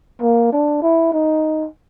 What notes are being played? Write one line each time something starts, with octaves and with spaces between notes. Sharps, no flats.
A#3
D4
E4
D#4